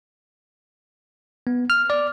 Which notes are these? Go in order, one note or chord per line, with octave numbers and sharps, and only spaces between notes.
B3
F6
D5